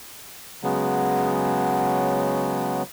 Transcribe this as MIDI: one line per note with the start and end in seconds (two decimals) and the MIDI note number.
0.63 2.83 49
0.63 2.83 54
0.63 2.83 56
0.63 2.83 59